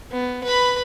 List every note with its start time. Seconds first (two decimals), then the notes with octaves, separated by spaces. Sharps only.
0.12 B3
0.44 B4 B5